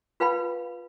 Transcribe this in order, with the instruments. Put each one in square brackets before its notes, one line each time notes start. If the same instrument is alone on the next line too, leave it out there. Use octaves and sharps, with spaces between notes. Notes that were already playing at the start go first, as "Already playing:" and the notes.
[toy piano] F4 B4 F5 G5 B5